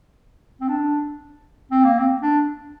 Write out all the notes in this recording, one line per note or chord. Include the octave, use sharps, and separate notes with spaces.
C4
D4
C4
A#3
C4
D4